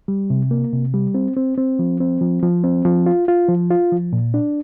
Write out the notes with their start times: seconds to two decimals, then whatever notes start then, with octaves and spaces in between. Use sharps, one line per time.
0.08 G3
0.30 C3
0.51 A#3
0.73 C3
0.94 G3
1.14 C4
1.36 C4
1.57 C4
1.79 F3
2.00 C4
2.21 F3
2.42 F3
2.64 C4
2.85 F3
3.06 F4
3.28 F4
3.49 F3
3.70 F4
3.92 F3
4.13 A#2
4.34 D4